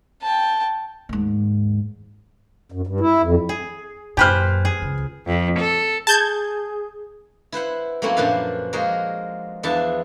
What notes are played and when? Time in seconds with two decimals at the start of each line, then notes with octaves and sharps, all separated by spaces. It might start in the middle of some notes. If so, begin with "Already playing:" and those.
0.22 G5 A5
1.09 D#2 G#2
2.72 F#2
2.87 G2
3.00 E4
3.22 F2
3.49 G#4
4.17 F#2 A#2 G4 B4 C5 G#5 F6
4.65 G#4
4.82 C#2
5.27 F2
5.60 A4
6.07 G#4 A5 G6 G#6
7.52 E4 B4 C5 F#5
8.02 F#3 A3 A#3 C4 C#4 E4
8.16 F#2 A#2 F3 D4 B4 F5
8.73 F3 G#3 A#3 F#4 G#4 A#4
9.63 E2 F3 B3 D4 E5 A5